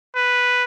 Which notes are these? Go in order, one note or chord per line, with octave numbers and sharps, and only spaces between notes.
B4